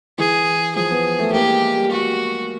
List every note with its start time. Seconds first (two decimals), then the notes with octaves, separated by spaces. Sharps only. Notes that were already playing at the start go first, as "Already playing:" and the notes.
0.18 E3 G#4
0.75 F3 G#4
0.90 B3
1.19 A3
1.33 A#3 G4
1.47 G#3
1.76 G3
1.91 F#4